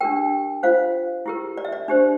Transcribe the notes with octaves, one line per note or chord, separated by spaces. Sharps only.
D4 G4 A#4 G5
F4 C5 F5
E4 G4 A#4
D5
E5
D5
D4 G4 C5